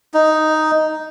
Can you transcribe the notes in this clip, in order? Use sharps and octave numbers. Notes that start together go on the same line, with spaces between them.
D#4